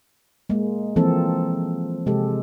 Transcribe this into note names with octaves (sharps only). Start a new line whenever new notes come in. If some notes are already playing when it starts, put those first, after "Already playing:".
G#3 A#3
E3 F3 A#3 C4 A4
C3 G#3 G4 A4